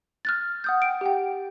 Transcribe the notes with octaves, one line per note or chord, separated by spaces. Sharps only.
F6 F#6 A6
F#5 D#6 G6
G5 D7
G4 F#5 G5